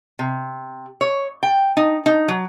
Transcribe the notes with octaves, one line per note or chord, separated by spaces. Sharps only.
C3
C#5
G5
D#4
D#4
F#3